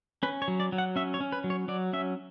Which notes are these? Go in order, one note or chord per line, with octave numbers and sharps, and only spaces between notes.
C#4 B4
C#5
F#3
D5
F#3
F#5
C#4 E5
C#5
C#4
B4
F#3
C#5
F#3 D5
C#4 E5